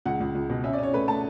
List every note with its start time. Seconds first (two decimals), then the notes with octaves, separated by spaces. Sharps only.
0.06 C#2 F#5
0.20 C#2
0.35 C#2
0.50 B2
0.64 C#4 E5
0.73 D5
0.78 C#4 C#5
0.93 A3 B4
1.08 A3 A5